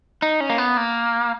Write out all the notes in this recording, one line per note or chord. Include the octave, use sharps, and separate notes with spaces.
D#4
C#4
A#3
B3
A#3